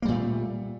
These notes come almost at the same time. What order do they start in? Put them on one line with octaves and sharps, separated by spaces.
A#3 G3 A#2 A3